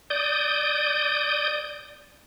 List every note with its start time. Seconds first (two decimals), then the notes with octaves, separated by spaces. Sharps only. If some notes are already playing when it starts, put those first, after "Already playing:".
0.10 D5 D#6 G6